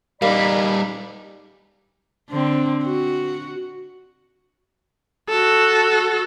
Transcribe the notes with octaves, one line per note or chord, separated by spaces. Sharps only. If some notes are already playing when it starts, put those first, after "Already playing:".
G3 A#3 D#4 D5 B5
D3 C4
F#4
F#4 A4